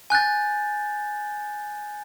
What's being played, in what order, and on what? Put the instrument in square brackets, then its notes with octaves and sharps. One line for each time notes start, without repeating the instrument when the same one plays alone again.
[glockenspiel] G#5 F#6 G6 A6